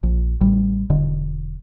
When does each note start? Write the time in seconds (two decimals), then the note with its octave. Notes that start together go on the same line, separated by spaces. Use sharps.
0.03 A#1
0.41 A1 G3
0.90 E1 D3